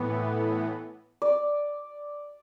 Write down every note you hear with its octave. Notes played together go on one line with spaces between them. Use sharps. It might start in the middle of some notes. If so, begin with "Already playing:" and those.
Already playing: A2 E3 B3
D5